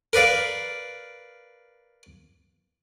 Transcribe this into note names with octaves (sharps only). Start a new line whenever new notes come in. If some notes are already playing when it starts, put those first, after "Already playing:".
A#4 B4 D5 F5